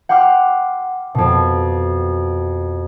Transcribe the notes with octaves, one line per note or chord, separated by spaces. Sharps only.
F#5 G5 C6 D6 F6
F2 B2